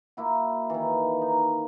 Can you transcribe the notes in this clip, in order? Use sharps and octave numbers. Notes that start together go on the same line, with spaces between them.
A#3 E4 F#4
D#3 E3
D#4